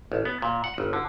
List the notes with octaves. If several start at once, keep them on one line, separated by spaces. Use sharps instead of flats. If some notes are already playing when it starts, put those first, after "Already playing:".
A1
B3
A#2
F#5
G1
D3